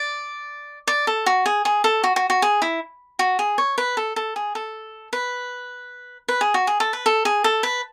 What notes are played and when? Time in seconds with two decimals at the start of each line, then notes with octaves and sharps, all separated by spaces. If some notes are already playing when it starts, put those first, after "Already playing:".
Already playing: D5
0.87 D5
1.07 A4
1.26 F#4
1.46 G#4
1.65 G#4
1.84 A4
2.04 F#4
2.16 F#4
2.30 F#4
2.42 G#4
2.62 E4
3.19 F#4
3.39 G#4
3.58 C#5
3.78 B4
3.97 A4
4.16 A4
4.36 G#4
4.55 A4
5.13 B4
6.28 B4
6.41 G#4
6.54 F#4
6.67 G#4
6.80 A4
6.93 B4
7.06 A4
7.25 G#4
7.44 A4
7.63 B4